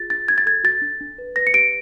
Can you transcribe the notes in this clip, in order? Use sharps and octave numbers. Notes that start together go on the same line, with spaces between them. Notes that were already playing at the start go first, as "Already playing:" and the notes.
Already playing: F4 G#4 A6
D4 A6
D4 G#6
A6
A4 G#6
F#4 A6
D4
D4
B4
B4 A#6
C#7
G4 D7